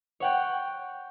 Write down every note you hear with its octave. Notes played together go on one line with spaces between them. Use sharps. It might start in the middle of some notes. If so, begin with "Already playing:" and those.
C#5 F#5 G5